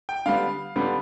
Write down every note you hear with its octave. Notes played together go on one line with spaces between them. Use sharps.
G5
D3 G3 B3 F5
D3 G3 B3